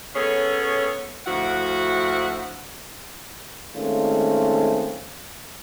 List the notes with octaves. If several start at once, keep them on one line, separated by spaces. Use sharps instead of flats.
B3 C#4 G#4 A4 C#5
D2 F3 E4 F#4 F#5
D#3 G#3 A3 C4 C#4 F4